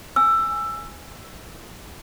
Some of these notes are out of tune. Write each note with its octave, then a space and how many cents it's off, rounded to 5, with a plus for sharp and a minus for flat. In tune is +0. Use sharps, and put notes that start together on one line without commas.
G#5 +0 E6 +15